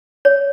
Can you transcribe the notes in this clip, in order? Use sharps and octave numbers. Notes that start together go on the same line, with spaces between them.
C#5